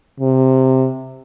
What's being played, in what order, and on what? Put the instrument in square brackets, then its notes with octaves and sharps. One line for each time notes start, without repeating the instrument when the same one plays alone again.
[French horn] C3